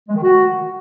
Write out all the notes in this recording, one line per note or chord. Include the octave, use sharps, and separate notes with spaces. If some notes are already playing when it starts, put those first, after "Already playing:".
G#3
D#3
F#4